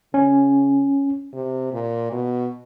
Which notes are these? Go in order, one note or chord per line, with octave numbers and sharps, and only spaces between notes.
C#3 C#4
C3
A#2
B2